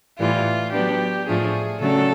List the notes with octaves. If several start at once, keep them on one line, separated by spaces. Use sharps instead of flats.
A2 E3 G3 F4
F#3 B3 D4 G4
A2 F3 A3 D4 G#4
C#3 F#3 A3 D4 A4